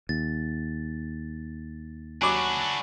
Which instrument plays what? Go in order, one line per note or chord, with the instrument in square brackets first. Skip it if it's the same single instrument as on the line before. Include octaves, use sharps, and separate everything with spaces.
[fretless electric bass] D#2 [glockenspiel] A6
[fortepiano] F#3 D6 [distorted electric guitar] D4 F#4 [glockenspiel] G#5 B5 F#7